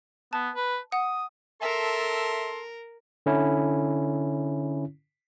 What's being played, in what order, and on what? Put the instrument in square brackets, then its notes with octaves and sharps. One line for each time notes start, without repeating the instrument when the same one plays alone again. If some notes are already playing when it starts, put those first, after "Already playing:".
[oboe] B3 [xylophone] A5
[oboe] B4
[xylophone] F#5 [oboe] D#6
[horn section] A4 A5 C6 [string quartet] A#4 [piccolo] E5
[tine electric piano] D3 C#4 E4